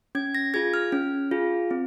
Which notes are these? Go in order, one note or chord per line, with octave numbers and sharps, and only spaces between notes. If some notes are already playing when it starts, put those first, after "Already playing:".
C#4 G#6
A#6
F4 G#4 G#6
F6
C#4
F4 G#4
C4